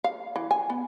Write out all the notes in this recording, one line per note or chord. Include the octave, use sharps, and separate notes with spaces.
F5
E3
G#5
B3